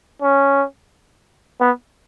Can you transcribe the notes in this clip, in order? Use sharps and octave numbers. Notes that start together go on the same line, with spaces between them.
C#4
B3